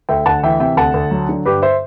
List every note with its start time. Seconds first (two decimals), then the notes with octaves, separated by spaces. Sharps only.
0.09 D2 E5 G5
0.26 D2 F#5 A5
0.43 E3 E5 G5
0.60 C3 E5 G5
0.77 D2 F#5 A5
0.94 D2
1.11 F#3
1.29 D3
1.45 G2 G4 B4
1.62 C5 E5